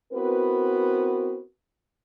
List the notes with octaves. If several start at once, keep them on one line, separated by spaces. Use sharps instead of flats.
B3 C4 E4 F#4 A#4 B4